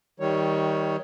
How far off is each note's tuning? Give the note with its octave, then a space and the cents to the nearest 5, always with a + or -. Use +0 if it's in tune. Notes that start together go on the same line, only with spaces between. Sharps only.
D#3 +20 G3 -5 C#5 +0